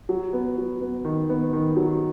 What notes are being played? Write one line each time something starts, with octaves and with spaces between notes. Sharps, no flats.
F#3
B3
F#3
B3
D#3
B3
D#3
F#3